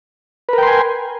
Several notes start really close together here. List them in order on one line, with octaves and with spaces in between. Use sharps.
B4 A#4 G5 C6 G#5